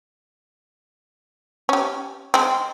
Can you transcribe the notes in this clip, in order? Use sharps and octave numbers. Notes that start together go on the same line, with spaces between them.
C#4 G4
G#3 C4